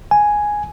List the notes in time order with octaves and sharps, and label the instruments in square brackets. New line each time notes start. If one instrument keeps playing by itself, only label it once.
[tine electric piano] G#5